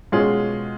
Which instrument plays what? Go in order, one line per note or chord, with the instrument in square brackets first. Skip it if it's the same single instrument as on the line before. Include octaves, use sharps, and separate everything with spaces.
[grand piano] B2 G#3 C#4 F4 G#4